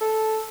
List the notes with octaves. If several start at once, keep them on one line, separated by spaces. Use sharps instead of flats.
A4